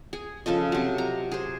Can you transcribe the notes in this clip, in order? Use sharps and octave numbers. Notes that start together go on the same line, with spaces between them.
G#4
C#3 F3 A4 D#5
C3 F#3
A#5
G#4 C5